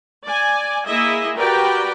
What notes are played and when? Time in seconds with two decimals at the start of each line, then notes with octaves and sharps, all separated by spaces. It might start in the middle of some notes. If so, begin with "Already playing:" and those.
0.24 D5 G#5
0.86 A#3 E4 G#4 D#5 E5
1.38 F#4 G4 A#4 B4 D5 G5